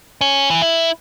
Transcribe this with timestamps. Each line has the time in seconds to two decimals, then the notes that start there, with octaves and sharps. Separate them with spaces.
0.21 C#4
0.50 E3
0.62 E4